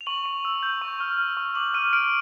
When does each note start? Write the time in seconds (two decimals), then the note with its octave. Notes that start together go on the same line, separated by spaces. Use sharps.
0.01 F7
0.07 C#6 F#7
0.26 C#6
0.45 E6
0.63 G6
0.81 C#6
1.00 F6
1.18 F6
1.37 C#6
1.55 D6 F#7
1.74 F6 D#7
1.93 F6 D7